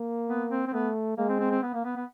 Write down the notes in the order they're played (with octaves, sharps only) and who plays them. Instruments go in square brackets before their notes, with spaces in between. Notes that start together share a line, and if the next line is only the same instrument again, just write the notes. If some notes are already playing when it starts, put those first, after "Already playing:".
Already playing: [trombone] A#3
[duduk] B3
C4
C4
[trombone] A3 [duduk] B3
[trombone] G#3 [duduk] A#3
[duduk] C4
C4
C4
B3
A#3
B3
B3